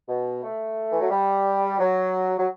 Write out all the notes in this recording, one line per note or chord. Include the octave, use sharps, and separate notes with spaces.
B2
A3
E3
F#3
G3
F#3
F#3